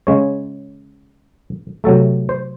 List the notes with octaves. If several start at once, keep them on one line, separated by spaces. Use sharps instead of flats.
C#3 G#3 C#5
C3 F#3 A3 A4
C5